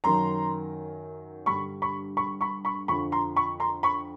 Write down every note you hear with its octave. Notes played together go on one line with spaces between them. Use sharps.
F#2 D#3 F#3 A#5 C6
G2 D3 G3 B5 C#6
B5 C#6
B5 C#6
B5 C#6
B5 C#6
F2 D3 F3 B5 C#6
A#5 C6
B5 C#6
A#5 C6
B5 C#6